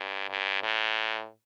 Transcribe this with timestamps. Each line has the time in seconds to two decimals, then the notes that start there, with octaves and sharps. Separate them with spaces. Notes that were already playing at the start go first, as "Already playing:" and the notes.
Already playing: G2
0.29 G2
0.63 A2